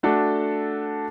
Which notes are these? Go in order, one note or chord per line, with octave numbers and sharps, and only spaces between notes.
A3 D4 F#4 A4